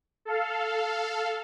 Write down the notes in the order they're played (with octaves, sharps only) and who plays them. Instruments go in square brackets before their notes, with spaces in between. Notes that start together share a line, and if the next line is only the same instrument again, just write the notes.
[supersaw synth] A4 F5